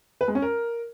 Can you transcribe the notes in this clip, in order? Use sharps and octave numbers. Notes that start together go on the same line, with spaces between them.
B4
G#3
C#4
A#4